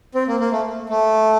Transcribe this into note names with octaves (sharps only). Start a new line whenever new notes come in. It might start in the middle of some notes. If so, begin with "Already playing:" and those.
C4
A#3
A#3
A3
A3